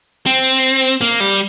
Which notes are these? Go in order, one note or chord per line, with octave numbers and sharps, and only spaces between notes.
C4
A#3
G3